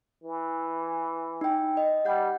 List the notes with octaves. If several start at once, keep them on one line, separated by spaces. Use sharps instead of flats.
E3
D#4 G5
D#5
G3 F#5 G6